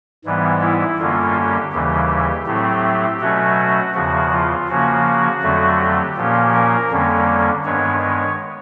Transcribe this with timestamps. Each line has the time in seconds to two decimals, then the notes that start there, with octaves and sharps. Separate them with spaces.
0.25 G#2 E3 G3 B3
0.61 E4
0.98 F#2 D3 G3 A#3 C#4 F4
1.35 G4
1.72 D#2 C#3 E3 G3 G4
2.46 A2 F#3 A3 C4 G4
3.20 B2 F#3 A3 C#4 F#4
3.94 E2 C#3 F3 F#4
4.31 F4
4.68 C#3 F3 A#3 C#4 F#4
5.06 F#4
5.42 F2 D3 F#3 A3
5.80 G4
6.17 A#2 F3 A#3 C#4
6.54 A#4
6.91 F2 D3 G3 A#3 C#4
7.65 G2 D#3 G#3 B3 C#5
8.01 C#5